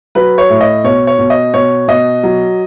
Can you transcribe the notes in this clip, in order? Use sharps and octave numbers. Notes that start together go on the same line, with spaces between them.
F#3 B4
C#5
A2
D#5
B2 C#5
C#5
B2
D#5
B2 C#5
B2 D#5
F#3